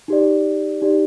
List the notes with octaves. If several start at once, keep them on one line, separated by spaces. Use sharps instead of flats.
D#4 G4 D5
D#4 G4 D5